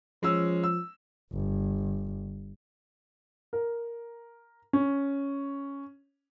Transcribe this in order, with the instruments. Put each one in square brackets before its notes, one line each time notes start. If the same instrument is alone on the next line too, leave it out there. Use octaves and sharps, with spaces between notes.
[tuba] F3 [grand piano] G#3 C#4 E6
[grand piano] E6
[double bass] G1
[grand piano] A#4
C#4